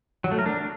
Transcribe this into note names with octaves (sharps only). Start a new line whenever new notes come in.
F#3
A3
A#4
D4